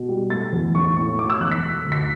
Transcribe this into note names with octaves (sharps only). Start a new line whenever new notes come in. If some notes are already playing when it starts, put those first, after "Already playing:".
Already playing: B2
G3
A3 A6
E2
A1 C#6
A2 C#6
B2 D6
E6
E1 F#6
B6
A3
D2
B6